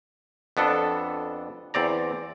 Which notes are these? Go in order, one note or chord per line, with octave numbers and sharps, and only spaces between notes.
F2 B3 D4 A4
E2 C4 D5 A#5